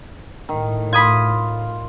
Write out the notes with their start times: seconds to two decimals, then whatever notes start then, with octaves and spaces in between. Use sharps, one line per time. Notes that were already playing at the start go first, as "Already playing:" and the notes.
0.49 A2 D#3
0.93 F4 B5 D#6 G#6